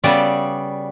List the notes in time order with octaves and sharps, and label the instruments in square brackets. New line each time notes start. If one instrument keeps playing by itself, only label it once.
[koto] C#3 G3 B3 F#4 A4 D5